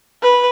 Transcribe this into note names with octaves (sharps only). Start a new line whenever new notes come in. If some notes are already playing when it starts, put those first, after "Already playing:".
B4